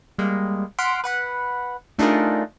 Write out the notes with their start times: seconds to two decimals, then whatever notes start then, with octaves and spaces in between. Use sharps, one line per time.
0.19 G3 G#3 A#3
0.79 F#5 C6 F6 B6 D7
1.04 B4 F#5 B5
1.98 A3 D4 D#4 F4 G#4 A#4